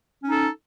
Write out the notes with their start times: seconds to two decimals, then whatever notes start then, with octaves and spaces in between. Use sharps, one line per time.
0.21 C#4
0.26 D#4
0.31 A4